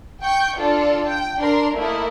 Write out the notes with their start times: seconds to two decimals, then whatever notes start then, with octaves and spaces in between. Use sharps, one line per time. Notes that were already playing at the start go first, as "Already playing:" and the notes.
0.21 G5 C#6 G6
0.55 D4 F4 A4 D5
1.07 G5
1.39 D4 A#4 C6
1.75 A3 A#3 E4 A#4 D#5